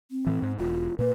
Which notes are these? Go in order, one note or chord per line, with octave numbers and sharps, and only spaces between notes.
C4
A2 E3
G#2
E1 F4
A#2 A#3 B4